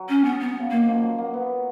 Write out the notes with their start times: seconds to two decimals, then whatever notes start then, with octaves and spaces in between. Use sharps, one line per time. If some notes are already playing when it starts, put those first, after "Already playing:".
Already playing: F#3
0.09 C#4
0.25 B3
0.40 B3
0.60 C#3
0.71 D#3 A#3
0.87 F3
1.03 F#3
1.18 A#3
1.34 B3